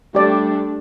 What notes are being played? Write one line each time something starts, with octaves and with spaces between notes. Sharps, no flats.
G3 A3 D4 G4 D5